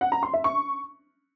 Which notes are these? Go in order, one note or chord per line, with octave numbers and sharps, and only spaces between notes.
F#5
A#5
C6
E5
C#6